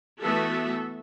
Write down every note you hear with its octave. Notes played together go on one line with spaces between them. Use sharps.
E3 A3 B3 F#4 A4 E5